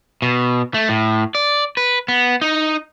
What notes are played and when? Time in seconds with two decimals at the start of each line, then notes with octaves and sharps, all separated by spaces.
0.22 B2
0.74 A3
0.89 A2
1.35 D5
1.77 B4
2.08 B3
2.42 D#4